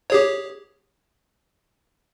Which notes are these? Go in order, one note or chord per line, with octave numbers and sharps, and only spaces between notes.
G4 G#4 C#5